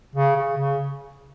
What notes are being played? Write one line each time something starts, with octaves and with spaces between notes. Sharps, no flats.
C#3
C#3
C#3